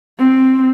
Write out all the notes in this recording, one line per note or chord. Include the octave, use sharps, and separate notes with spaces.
C4